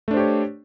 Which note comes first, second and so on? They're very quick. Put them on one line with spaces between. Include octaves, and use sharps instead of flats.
A3 D4 C5 G4 C#5